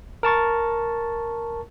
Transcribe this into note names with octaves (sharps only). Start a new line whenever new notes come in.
A#4 A5 C#6 A6